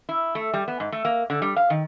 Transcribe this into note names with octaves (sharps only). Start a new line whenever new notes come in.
E4
A3
G3
B3
G#2
A3
A#3
D3
G3
F5
D#3